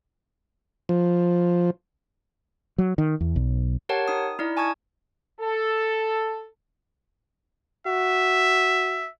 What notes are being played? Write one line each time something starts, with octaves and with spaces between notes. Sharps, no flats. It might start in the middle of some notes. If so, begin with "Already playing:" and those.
F3
F#3
D#3
E2
B1
G4 A#4 C#5 F#5 G5 A5
D#4 D#6
D#4 E4 D5
G#5 A5 C#6 D#6 G#6
A4
F#4 E5